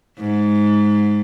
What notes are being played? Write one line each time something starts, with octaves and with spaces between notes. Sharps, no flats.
G#2